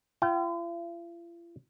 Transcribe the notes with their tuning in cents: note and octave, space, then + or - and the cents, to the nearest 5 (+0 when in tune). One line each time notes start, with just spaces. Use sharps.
F4 -45 G5 -35